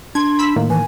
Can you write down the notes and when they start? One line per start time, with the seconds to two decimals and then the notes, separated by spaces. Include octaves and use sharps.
0.15 D4 C6 G#6
0.39 B5 E6 B6
0.56 A2 D#3 A#3
0.70 E3 G#5